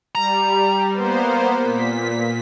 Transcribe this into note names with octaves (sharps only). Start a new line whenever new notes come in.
G3 A#5
A#3 B3 C5
A#2 B6